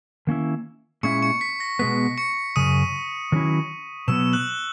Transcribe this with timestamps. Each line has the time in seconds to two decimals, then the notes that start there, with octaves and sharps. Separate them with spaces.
0.27 D#3 A#3 C#4 E4
1.03 A#2 G#3 C#4 E4 C#6 C#7
1.22 C#6 C#7
1.41 B6
1.60 A#6
1.79 B2 G#3 B3 B6
2.18 C#6 C#7
2.56 F#2 C#3 D#6 D#7
3.32 D#3 F#3 C#4 E4
4.08 B2 F#3 B3 E6 E7
4.33 F#6 F#7